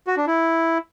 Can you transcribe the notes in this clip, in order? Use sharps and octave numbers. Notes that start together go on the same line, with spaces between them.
F#4
D4
E4